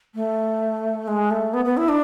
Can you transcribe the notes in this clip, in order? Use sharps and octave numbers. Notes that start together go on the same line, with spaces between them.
A3
G#3
A3
B3
B3
E4
D4